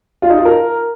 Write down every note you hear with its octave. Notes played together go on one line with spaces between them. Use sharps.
F4
D#4
F4
A#4